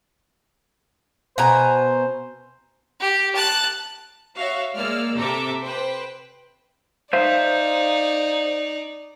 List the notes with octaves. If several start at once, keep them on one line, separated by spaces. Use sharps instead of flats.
B2 C5 G#5 A#5
G4
A5 F#6
F#4 C#5 E5 F5
G#3 A#3 D5 E6 F6
C3 G4 A4 E5 A#5 D6
B4 C5 G5
D#4 C5 D5 E5 F5